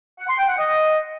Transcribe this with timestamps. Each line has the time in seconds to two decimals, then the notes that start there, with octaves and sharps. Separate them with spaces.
0.19 F#5
0.29 C6
0.38 G5
0.48 F#5
0.58 D#5